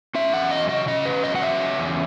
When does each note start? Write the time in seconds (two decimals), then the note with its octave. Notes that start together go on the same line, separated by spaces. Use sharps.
0.15 C#4 E5
0.33 E2 F#5
0.51 F#3 D#5
0.69 C#3 D#5
0.88 C#4 D#5
1.05 E2 B4
1.24 F#3 D#5
1.36 F#5
1.42 C#3 E5
1.60 C#4
1.79 E2